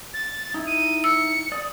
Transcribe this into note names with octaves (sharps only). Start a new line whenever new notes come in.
A6
D#4 E4
D#7
E6 C#7
D5 D#6